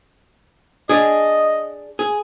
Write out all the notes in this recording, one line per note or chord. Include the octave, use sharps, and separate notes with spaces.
D4 G#4 D#5
G#4